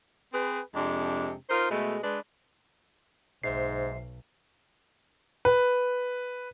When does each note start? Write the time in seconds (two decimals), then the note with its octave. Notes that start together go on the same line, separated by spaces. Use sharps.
0.32 C4 G#4 B4
0.75 F2 C3 G#3 D4
1.49 D#4 F4 A#4 C5
1.70 B2 G#3 A3
2.03 G#3 D4 B4
3.44 B1 G#2 C5 E5 C7
5.45 B4